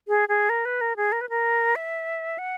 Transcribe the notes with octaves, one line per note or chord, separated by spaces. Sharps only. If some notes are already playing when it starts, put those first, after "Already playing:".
G#4
G#4
A#4
B4
A#4
G#4
A#4
B4
A#4
E5
F#5